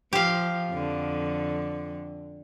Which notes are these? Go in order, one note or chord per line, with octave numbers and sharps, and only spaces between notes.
F3 G4 F5
F2 D3